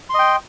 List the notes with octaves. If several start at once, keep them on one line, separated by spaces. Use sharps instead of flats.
D#5 G5 C6